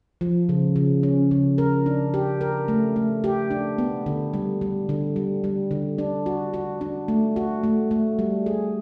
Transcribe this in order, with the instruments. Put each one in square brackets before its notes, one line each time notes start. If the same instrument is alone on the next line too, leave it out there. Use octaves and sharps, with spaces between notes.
[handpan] F3
C#3
C#3
C#4
C#3
A#4
D4
G4
A#4
A3
A3
G4
D4
B3
D3
G3
G3
D3
G3
G3
D3
D4
F#4
F#4
D4
A3
F#4
A3
A3
G3
G#4